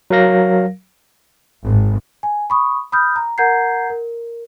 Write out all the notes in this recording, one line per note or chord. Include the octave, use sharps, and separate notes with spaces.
F#3 A#4 F5 A#6
G#1
G#5
B5 C#6 D#6
B5 D#6 F6 G6
A#5
A#4 F#5 A#5 G6 G#6 C7
A#4